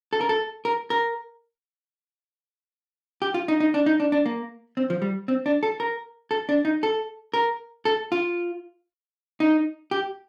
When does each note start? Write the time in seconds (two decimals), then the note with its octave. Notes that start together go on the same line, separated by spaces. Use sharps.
0.13 A4
0.21 A#4
0.29 A4
0.65 A#4
0.90 A#4
3.22 G4
3.34 F4
3.48 D#4
3.60 D#4
3.74 D4
3.86 D#4
4.00 D4
4.12 D4
4.26 A#3
4.77 C4
4.90 F3
5.02 G3
5.28 C4
5.46 D4
5.63 A4
5.80 A#4
6.31 A4
6.49 D4
6.65 D#4
6.83 A4
7.34 A#4
7.85 A4
8.12 F4
9.40 D#4
9.91 G4